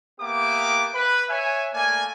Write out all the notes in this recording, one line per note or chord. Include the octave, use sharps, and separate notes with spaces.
A#3 B3 G4 E5 D6
B4
C#5 E5 G#5
A3 A#3 D5 G#5